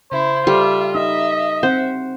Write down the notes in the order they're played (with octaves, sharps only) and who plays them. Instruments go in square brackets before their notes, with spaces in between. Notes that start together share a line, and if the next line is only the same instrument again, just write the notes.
[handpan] C#3 [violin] E4 [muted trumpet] C5
[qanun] G3 [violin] F4 E5 [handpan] A4
[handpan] D#4 [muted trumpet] D#5 [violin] E5
[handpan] C4 F#5 [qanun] C5